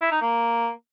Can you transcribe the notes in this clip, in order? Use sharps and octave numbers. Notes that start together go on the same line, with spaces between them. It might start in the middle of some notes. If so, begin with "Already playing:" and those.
E4
D#4
A#3